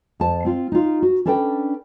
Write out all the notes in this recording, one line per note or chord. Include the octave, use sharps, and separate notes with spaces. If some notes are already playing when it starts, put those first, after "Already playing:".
F2 A5
C4 F4
D#4 F4
F#4
C#4 D4 A4 B4 F#5 G5